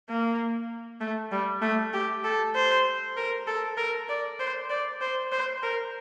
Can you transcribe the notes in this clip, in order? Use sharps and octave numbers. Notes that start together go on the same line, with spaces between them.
A#3
A3
G3
A3
G4
A4
C5
A#4
A4
A#4
D5
C5
D5
C5
C5
A#4